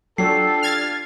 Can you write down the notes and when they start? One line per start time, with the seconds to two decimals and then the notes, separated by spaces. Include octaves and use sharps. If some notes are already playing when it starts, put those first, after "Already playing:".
0.18 F#3 D4 F4 G4 A4 C7
0.62 F6 G#6 A6